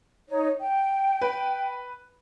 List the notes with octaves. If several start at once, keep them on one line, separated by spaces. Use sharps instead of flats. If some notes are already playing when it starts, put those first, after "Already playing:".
D#4 C#5
G5
B4